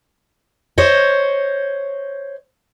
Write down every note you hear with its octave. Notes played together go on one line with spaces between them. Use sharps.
C5 C#5 D#5